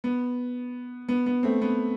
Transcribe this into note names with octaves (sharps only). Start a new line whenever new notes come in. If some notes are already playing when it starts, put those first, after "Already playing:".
B3
B3
B3
A3 C4
B3